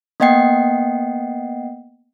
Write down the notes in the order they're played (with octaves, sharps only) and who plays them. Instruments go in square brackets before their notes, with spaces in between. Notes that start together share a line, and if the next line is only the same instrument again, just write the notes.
[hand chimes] A#3 B3 D#5 F#5 G5 C7